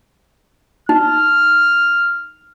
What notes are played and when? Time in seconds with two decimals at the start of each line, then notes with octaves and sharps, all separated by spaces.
0.89 D#4 F6